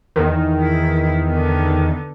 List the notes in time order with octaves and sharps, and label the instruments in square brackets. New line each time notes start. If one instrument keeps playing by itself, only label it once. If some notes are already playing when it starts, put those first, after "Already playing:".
[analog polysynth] E2 D#3
[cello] E4
D3 B3